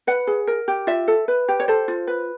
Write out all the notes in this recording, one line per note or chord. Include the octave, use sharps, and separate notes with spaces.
B4 F#5
G#4
A#4
G4
F4 E5
A4
B4
G4
C#5
A4 C5
F4
B4